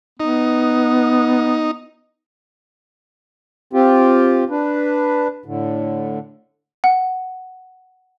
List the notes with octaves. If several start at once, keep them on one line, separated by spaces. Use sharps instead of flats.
B3 D#4
C4 F4 G4
D4 B4
A2 D3
F#5